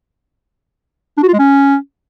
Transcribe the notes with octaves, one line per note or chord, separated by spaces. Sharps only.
D4
F#4
F4
G#3
C#4